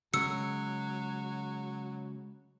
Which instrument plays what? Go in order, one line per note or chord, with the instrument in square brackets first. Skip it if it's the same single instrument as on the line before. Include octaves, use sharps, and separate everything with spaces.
[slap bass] C#3 G#3 [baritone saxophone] F#3 [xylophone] E6 C#7